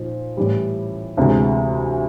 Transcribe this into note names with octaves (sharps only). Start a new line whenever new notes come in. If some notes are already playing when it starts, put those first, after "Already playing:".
Already playing: A#2 F3 D#4
A2 E3 G3
D2 C3 E3 G#3